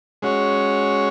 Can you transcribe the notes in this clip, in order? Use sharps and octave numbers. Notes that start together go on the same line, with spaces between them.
G#3 C#4 F#4 C#5